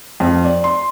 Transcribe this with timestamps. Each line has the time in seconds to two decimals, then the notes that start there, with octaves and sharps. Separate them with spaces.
0.20 F2
0.44 D5
0.64 C6